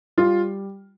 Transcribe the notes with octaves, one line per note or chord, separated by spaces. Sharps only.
G3 F4